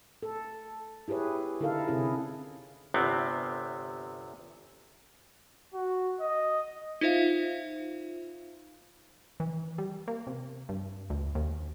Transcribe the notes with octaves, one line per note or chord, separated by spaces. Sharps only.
A4
E4 G4 G#4 B4 C#5
D3 D#4 E4 A4 A#4 F5
C3 C#4 E4 G#4
G1 E2 C3 B3 C4
F#4
D#5
D#4 F4 C5 E5 F5
E3
G3
A#3
C3
G2
D2
D#2